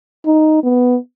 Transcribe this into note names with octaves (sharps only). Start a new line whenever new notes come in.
D#4
B3